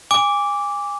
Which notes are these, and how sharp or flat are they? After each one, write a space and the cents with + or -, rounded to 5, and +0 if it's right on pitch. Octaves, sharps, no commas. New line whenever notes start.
G#5 -30 D6 -10